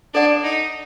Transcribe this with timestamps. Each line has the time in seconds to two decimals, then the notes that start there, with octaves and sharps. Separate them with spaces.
0.14 D4 A4 D5 F#5
0.44 D#4